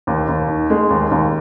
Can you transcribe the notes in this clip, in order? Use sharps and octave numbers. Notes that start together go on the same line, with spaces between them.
D#2
D#2
D#3
G#3
D#2
D#2